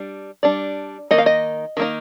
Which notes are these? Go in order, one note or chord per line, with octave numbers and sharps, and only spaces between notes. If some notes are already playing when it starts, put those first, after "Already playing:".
Already playing: G3 D4
G3 D4 D5
D#3 A#3 D#4 D#5
F5
D#5
D#3 A#3 D#4